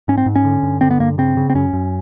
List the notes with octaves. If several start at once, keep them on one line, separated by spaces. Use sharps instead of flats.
G#2 C#4
C4
G#2
C#4
D3
G2
D3 C4
B3
G2 A#3
C#3 C4
C#3
C4
F#2 C#4
F#2